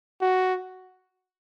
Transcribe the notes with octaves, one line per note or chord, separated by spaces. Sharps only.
F#4